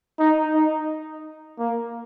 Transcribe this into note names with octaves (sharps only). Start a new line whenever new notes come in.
D#4
D#4
A#3